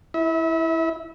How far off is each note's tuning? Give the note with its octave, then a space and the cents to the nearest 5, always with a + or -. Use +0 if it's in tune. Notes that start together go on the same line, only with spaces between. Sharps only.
E4 +0 E5 -30